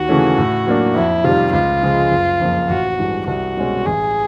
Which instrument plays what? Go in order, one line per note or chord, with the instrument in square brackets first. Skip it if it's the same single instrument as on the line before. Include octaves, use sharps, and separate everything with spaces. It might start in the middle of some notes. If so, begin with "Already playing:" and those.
Already playing: [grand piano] D#2 [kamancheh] F#4
[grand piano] C#3 E3 A3 C#4
A2
F#3 A#3 D4
[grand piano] F2 [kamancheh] E4
[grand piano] C3 D#3 G3 [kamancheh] F4
[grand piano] C#2 [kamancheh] F4
[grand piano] C#3 F3 G#3
F#1
F2 C#3 F3 A#3
[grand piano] A1 [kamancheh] F#4
[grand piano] G2 E3 G#3
[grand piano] C2 [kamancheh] F#4
[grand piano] B2 G#3 C#4
[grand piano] A1 [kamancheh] G#4